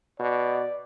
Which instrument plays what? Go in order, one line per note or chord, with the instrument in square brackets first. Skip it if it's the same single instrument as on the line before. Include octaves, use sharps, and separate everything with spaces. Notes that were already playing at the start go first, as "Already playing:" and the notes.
[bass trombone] B2 [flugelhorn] D5